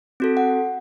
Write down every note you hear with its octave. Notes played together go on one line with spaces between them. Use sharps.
C4 F#4 A4
F#5